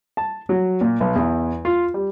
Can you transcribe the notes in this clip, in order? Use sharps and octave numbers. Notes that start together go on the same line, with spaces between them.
A5
F#3
A#2
B1
E2
F4
G3